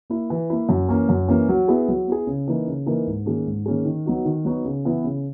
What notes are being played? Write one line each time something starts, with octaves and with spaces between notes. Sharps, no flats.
A#3 E4
E3
A#3 E4
F#2
E3 A#3 C#4
F#2
E3 A#3 C#4
F#3
B3 E4 G#4
F#3
B3 E4 G#4
C#3
E3 A#3 D#4 A#4
C#3
E3 A#3 D#4 A#4
G#2
D#3 A#3 C#4 G#4
G#2
D#3 A#3 C#4 G#4
D#3
F#3 B3 D#4 F#4
D#3
F#3 B3 D#4 F#4
C#3
E3 B3 E4
C#3